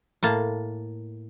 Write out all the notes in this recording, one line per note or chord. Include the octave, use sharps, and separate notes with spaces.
A2 A#3 A5